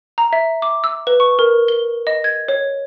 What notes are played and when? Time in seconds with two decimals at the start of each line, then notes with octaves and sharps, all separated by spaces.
0.18 A#5
0.33 E5
0.62 D6
0.84 E6
1.07 B4
1.20 C#6
1.39 A#4
1.68 G7
2.07 D#5
2.24 G#6
2.48 C#5